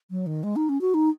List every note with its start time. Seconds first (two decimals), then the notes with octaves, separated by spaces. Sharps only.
0.11 F#3
0.26 D#3
0.43 G#3
0.56 D#4
0.69 C#4
0.81 F#4
0.94 D#4